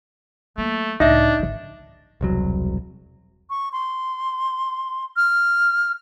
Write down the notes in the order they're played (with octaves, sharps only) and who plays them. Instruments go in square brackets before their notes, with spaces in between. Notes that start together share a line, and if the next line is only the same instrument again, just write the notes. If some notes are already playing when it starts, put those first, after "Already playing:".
[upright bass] F#3 A#3 [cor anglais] A3
[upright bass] C#2 A2 [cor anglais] D4 [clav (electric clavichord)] D#4 [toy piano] D#5 E5
[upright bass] G#1 D3
[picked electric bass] E1 C2 F#3
[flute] C#6
C6
F6